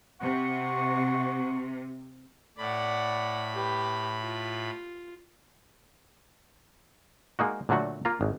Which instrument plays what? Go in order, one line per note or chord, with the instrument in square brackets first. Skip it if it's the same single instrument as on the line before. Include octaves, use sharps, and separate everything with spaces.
[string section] C3 [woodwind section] F#5 C#6
[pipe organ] A2 B5 [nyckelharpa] D5 F#5
[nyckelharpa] G4 B4
F4
[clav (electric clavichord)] G#3 A#3 D#4 F#4
A#2 D3 F#3 A3 F#4
A#3 F4 A#5
G#1